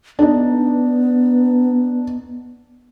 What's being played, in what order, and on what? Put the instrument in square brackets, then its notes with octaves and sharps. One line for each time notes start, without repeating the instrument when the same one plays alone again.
[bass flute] B3 [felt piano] D4 D#4